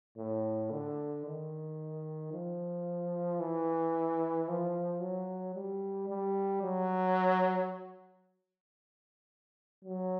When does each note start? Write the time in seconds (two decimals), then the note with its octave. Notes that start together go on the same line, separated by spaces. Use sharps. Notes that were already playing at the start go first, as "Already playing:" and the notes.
0.18 A2
0.71 D3
1.25 D#3
2.33 F3
3.40 E3
4.48 F3
5.01 F#3
5.55 G3
6.09 G3
6.62 F#3
9.85 F#3